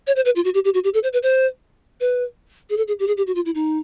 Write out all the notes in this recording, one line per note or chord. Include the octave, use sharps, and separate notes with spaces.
C#5
C5
B4
F4
F#4
G4
G4
F#4
G4
A4
C5
B4
C5
B4
G#4
A4
G#4
G4
G#4
G4
F#4
F4
E4
D#4